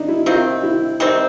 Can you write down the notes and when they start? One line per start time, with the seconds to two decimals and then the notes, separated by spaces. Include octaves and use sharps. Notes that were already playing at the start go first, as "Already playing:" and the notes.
Already playing: D4 D#4
0.08 E4
0.26 C3 D#3 G3 C4 F4
0.63 E4
1.00 C3 D#3 G3 C4 D#4